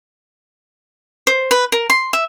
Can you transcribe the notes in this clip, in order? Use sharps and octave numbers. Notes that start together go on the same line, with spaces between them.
C5
B4
A#4
C6
E5